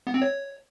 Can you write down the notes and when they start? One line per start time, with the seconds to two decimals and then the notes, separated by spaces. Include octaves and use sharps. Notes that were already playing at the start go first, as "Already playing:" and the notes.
0.07 B3
0.14 C4
0.22 C#5